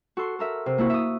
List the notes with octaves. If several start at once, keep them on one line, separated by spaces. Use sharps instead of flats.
F#4 A4 C6
A4 A#4 E5
C3
A#3 E4 F#4
E5 D#6